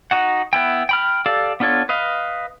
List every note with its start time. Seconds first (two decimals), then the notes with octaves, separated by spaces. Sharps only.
0.11 D#4 F#4 F#5
0.53 B3 E4 G5
0.89 G5 B5 F6
1.26 G4 A4 D5 F5
1.60 B3 D4 F4 A4 C#5
1.89 B4 D#5 F5